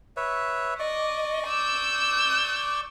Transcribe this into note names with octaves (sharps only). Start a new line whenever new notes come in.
B4 C#5 E5
D5 D#5 C#6 D6
E6 G6